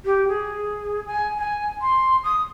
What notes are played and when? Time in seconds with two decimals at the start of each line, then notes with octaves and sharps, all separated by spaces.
0.05 G4
0.28 G#4
1.06 G#5
1.38 G#5
1.81 C6
2.24 D#6